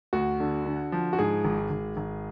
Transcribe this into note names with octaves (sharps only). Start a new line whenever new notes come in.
D2 F#4
D3
D3
F3
F#4
G#2 G#4
G#1
G#1
G#1